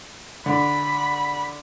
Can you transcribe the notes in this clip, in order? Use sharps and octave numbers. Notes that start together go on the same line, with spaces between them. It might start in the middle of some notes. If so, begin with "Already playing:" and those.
D3 B5